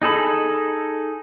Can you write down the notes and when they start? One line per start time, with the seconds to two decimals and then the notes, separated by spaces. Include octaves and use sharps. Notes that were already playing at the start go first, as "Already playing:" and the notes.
0.02 D#4 G#4 A4 B5